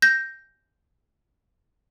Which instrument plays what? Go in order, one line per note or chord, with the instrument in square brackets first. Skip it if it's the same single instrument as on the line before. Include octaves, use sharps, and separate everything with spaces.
[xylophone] G6 A#6